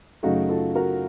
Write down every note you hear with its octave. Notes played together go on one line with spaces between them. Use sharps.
F#2 C#3 A3 D#4 F#4
F4 A4
F#4 A#4